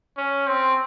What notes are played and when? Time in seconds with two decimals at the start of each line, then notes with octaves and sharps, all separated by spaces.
0.17 C#4
0.47 C4